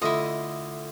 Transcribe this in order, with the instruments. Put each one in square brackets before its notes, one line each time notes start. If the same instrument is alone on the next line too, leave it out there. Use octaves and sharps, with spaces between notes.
[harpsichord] D3 A3 F4 [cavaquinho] E4 D#5